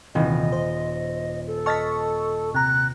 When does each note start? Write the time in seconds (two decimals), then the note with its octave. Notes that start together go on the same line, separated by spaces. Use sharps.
0.15 D#1 C3 E3 D#5
0.52 C5
1.47 A4
1.66 D#5 A5 C#6 F6 A6 B6
2.55 C3 A#5 F#6